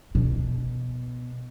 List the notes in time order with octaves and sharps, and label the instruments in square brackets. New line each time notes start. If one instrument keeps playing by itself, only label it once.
[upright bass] B2